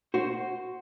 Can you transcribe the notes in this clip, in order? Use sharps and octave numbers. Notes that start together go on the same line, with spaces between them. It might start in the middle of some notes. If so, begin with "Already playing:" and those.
F#4 C5